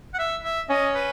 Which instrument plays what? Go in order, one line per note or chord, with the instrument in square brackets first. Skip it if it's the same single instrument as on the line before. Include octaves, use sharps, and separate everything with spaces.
[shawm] F#5
E5
E5
[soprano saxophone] C#4 [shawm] D#5
[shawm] B4